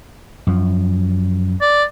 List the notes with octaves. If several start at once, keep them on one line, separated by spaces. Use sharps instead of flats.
F#2 F3
D5